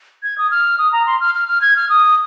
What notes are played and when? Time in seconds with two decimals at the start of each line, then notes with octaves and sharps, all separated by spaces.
0.23 G#6
0.38 D#6
0.51 F6
0.78 D#6
0.93 A#5
1.07 C6
1.20 F6
1.35 F6
1.48 F6
1.62 G#6
1.77 F6
1.89 D#6